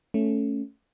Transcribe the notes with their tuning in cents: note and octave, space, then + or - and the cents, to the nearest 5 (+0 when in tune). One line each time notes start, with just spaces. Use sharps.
A3 +0 C#4 +0